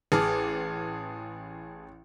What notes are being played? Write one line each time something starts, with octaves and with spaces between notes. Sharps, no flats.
A1 G#4 A5 D6 F6